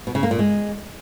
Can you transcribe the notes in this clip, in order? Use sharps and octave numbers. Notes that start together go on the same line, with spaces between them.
B2
C#3
A#3
A#2
G#3